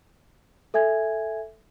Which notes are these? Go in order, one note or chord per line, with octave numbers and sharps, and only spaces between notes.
A4 E5 G#5 G#6